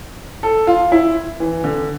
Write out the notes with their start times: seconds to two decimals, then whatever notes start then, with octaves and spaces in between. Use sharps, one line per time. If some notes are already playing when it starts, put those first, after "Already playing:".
0.43 A4
0.67 F4
0.92 E4
1.40 E3
1.64 D3